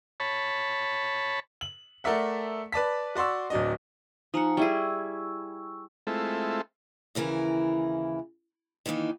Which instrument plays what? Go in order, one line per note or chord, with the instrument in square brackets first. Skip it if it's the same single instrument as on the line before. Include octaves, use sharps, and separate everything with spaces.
[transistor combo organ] C#5 A5 B5
[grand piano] F#7
A3 A#4 D5 E5 F#5
B4 D5 A5 B6
F#4 D5 C6 C#6 E6
D1 F#3 D4 D#5
[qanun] F3 F#5 [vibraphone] D#4 G#5 A#5
[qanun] G3 E4 G#4 [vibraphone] C#6 E6
[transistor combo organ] G#3 A3 C4 E4 F4 A4
[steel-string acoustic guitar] D#2 C#3 E3 E4 A#4
D#3 E3 A3 A#3 D#4